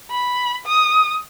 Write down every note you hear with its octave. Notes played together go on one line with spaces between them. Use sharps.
B5
D#6